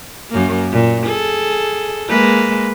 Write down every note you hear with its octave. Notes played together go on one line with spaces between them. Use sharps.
F#2 A#3
A#2
G#4 A4
G#3 A#3 B4